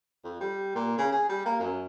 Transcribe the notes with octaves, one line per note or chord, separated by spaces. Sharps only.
F2
G3
A#2
C#3
G#4
G3
A#3
F#2